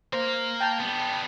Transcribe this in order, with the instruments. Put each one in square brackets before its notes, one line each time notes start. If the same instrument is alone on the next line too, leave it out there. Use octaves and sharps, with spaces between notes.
[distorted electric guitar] A#3 A#4 [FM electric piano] C5
[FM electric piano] G5 A5 G6
[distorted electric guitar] G3 B3